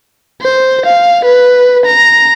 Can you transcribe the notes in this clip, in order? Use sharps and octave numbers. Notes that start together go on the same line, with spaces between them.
C5
F5
B4
A#5